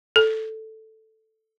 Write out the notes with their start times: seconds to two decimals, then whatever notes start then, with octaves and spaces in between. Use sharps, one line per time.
0.16 A4